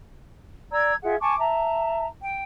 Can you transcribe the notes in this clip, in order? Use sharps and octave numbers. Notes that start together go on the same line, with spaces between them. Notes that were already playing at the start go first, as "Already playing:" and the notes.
D5 A#5 E6 G#6
F4 G#4 E5 F#5
G#5 A5 C#6 D6
E5 A5 A#5
G5